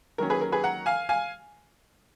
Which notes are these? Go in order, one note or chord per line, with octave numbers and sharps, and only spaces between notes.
D#3 F#3 A#3 C#4 A#4
G#4 B4
A#4
G#4 B4
F#5 A#5
F5 G#5
F5 G#5